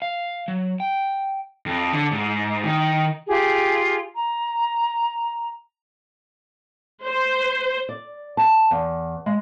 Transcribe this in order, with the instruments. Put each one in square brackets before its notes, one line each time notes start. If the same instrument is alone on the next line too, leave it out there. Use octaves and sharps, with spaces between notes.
[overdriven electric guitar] F5
F#3
G5
[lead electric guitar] F2
D3
G#2
D#3
[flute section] F4 G4 G#4
A#5
[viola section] C5
[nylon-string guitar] D5
A5
E2
G#3